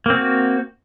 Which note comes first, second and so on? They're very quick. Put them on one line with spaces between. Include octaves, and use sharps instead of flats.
A#3 C4 F#4